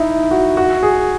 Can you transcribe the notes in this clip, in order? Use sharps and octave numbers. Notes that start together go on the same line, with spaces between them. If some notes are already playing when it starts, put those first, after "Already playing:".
Already playing: D#4 E4
F#4
F#4
G#4